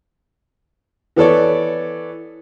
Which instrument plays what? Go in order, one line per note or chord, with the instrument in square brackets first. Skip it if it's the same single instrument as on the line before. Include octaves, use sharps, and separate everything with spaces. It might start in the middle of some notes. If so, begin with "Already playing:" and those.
[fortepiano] E3 B3 A4 C#5 D5